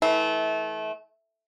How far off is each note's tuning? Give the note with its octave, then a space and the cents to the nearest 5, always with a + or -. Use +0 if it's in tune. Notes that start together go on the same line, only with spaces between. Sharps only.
E3 -30 A3 -25